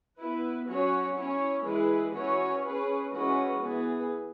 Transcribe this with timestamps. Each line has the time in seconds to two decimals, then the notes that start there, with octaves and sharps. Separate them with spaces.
0.18 B3 E4 B4
0.67 F#3 C#4 F#4 C#5
1.16 C#4 E4 C#5
1.65 E3 G#3 E4 G#4 B4
2.14 E3 C#4 F#4 C#5
2.64 C#4 G#4 B4
3.13 E3 G#3 C#4 F#4 B4
3.60 E3 B3 G#4 B4